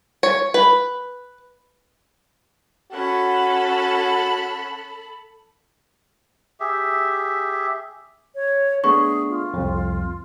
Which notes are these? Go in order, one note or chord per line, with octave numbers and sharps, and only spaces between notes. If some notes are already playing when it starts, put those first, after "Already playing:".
C#5
B4
C#4 F#4 A4 F#5 B5
G4 G#4 E5
C#5
A3 B3 D4 G#4 C#6
F4
C2 F2